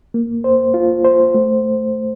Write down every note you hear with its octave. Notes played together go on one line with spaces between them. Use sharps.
A#3
C5
F4
C5
A3